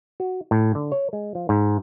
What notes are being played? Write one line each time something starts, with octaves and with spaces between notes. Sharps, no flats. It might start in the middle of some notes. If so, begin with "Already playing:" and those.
F#4
A2
D3
C#5
G#3
F3
G#2